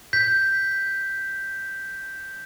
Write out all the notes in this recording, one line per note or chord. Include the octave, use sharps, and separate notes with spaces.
G6 B6